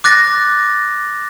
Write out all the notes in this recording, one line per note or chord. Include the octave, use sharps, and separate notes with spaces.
D6 F#6 A6 A#6